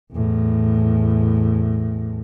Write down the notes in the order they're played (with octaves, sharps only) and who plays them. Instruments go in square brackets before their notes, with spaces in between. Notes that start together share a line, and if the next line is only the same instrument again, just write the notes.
[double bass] E2 A2